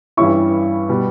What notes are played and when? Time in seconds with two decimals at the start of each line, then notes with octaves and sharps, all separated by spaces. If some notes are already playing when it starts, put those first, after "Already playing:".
0.17 G2 E3 G3 C#4 E4 C#6
0.89 B2 G3 B3